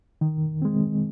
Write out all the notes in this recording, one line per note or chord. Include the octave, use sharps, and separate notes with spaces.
D#3
G#3 C4